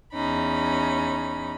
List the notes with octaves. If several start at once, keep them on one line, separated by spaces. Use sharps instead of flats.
E2 C#4 D#4 B5